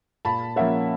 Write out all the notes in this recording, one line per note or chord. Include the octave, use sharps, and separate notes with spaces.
A#2 A5 B5
F3 A#3 C#4 E5 F#5